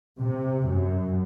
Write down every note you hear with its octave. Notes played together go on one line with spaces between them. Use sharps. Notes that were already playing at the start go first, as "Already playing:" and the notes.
C3
F#2